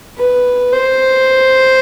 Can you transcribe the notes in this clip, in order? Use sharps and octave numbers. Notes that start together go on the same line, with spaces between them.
B4
C5